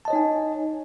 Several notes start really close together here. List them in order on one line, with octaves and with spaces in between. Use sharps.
A5 D#5 C#5 D#4 G#5